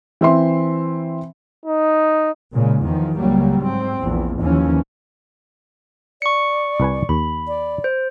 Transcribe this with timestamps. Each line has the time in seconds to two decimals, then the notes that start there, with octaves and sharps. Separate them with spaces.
0.21 E3 C4 E5 C6
1.65 D#4
2.52 A#2 C#3 G#3
2.82 E2 D#3 F3
3.17 C#2 F#3 G3 A#3
3.59 G#2 C4
4.00 A#1 E2
4.41 D#2 E3 F3 C#4
6.22 D5 C#6 C#7
6.80 C2 B4 G#5
7.09 D#2 B5
7.48 D5
7.84 C5